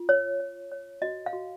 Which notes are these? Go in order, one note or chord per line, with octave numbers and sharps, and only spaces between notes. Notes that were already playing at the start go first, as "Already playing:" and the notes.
Already playing: F4
C#5
C#5
C#5
F#4 D#5
F5
F#4